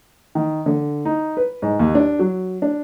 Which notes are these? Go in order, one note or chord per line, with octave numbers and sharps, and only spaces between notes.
D#3
D3
D#4
B4
G#2
D#2
D4
F#3
D4